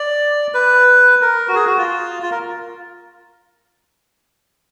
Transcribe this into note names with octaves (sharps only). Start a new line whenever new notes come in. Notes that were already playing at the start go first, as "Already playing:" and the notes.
Already playing: D5
B4
A#4
F#4
G#4
F#4
F4
F4
A#4